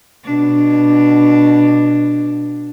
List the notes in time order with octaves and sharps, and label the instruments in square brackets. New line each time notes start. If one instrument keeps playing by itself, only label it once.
[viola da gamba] B2 D4